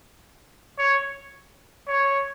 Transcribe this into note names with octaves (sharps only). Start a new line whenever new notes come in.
C#5
C#5